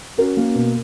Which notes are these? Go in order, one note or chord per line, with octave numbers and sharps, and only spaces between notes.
C#4 F#4 A#4
A#3
B2